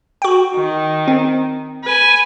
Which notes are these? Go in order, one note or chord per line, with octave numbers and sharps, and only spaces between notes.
F#4 G5
D#3
C4
B4 G#5